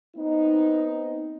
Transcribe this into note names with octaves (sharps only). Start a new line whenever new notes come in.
B3 C4 D#4